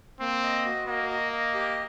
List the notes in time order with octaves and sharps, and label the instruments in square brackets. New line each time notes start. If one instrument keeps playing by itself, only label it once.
[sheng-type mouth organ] A#3 [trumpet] C4
[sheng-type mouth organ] D#5
F#4
[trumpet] A#3 [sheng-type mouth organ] D#5
[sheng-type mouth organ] D#5
D#5
G4